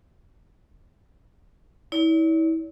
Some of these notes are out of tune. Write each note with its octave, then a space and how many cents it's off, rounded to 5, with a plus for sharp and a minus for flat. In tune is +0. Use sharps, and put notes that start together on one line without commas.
E4 -35 D5 -45